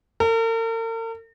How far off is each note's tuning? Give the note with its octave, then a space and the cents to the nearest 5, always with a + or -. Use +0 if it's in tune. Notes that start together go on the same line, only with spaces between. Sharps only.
A#4 -45